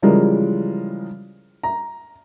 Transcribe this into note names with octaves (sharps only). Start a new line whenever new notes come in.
C#3 E3 F3 G3 G#3 A#4
A#5